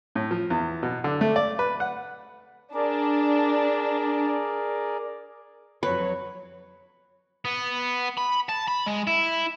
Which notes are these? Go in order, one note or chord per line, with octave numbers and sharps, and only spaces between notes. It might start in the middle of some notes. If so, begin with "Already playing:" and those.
A2
F3
E2
B2
D3
A3
D5
B4
F#5
D4 G#4 A#4 D5
F2 F#3 B4 C#5
B3
B5
A5
B5
G#3
E4